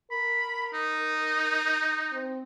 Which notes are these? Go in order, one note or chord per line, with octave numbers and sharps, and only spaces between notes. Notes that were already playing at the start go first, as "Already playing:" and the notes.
A#4 B5
D#4
C4